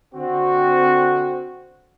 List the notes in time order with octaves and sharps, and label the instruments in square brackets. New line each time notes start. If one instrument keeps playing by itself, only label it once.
[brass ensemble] D3 C4 F#4